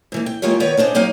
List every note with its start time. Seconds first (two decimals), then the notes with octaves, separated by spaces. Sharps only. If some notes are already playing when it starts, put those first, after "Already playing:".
0.12 G#2 E3 A#3
0.26 G5
0.42 E3 G#3 A#3 F4 G4 C#5
0.60 D#3 B3 B4 C#5 D5
0.77 A#3 C#4 D4 C5 D#5
0.95 F#3 A#3 D#4 G4 F5